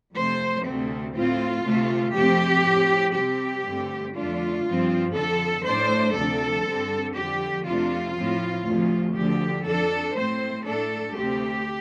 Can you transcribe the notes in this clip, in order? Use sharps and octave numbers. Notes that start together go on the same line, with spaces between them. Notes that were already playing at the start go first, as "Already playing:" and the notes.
F2 C3 A3 C5
D2 C3 A3 C4
A2 A3 C4 F4
D2 C3 A3
F2 C3 F3 A3 C4 G4
A2 F3 C4
C3 G3 C4 G4
G2 D3 A3 C4
F2 D3 A3 D4 F4
G2 F3 C4
F2 D3 F3 A4
A2 A3 D4 C5
D2 C3 F3 D4 A4
G2 D3 G3 C4
F2 D3 F3 G4
F2 C3 A3 D4 F4
A2 F3 C4
D2 C3 F3
D2 D3 F3 G4
F2 F3 D4 A4
A2 A3 C4 C5
A2 A3 D4 A4
D2 C3 A3 C4 G4